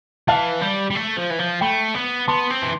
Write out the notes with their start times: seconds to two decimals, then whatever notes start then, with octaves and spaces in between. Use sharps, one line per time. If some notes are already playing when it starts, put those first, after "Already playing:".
0.28 E3 F5 A5
0.61 G3
0.90 G3
0.95 A3
1.17 F3
1.30 E3
1.39 F3
1.61 A3 G5 B5
1.95 B3
2.28 B3 A5 C6
2.50 C4
2.62 E3